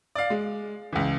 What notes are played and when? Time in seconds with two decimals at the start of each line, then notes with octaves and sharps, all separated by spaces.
0.15 D5 F5
0.30 G#3
0.93 C#2 E3